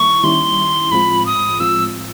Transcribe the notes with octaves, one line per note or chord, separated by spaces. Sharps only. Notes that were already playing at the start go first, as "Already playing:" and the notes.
Already playing: D#3 G3 A#3 E4 C#6
D#3 G3 A#3 C#4 E4 C6
A2 F3 G#3 C4 F4 B5
D#6
A2 F3 G#3 C4 F4 E6